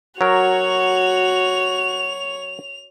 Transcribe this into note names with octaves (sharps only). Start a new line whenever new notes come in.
F#3 F#4 A#4 C#5 F7